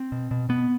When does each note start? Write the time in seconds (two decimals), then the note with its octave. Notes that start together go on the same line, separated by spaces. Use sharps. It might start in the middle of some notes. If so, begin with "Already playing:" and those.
Already playing: C4
0.12 B2
0.31 B2
0.49 B2 B3